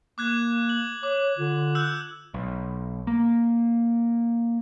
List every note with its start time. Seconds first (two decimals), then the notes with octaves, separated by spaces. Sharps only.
0.18 A#3 D6 F#6 G#6
0.69 F#7
1.03 C#5 D6
1.38 D3 F4
1.75 E6 F#6 G6
2.34 B1
3.07 A#3